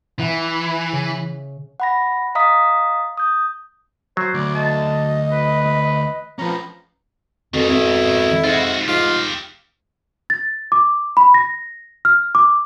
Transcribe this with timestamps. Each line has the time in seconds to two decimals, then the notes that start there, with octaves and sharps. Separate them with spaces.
0.19 E3 E5 F#5 A#5
0.92 C#3
1.80 F#5 B5 A#6
2.35 D#5 F5 A#5 D#6 B6
3.17 D#6 G6
4.17 F#3 C5
4.34 D2 D5
4.55 D#5 A5
5.32 B4
6.39 F3 C#4 B4 A#5
7.54 F2 G#2 B2 D#3
7.69 F2 E4
8.44 G#2 F4 F#4
8.88 G#2 F4 G4 F5
10.30 A6
10.72 D6
11.17 B5
11.34 A#6
12.05 F6
12.35 D6